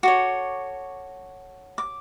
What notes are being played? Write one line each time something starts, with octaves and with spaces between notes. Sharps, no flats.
F#4 A4 C#5 D6
D6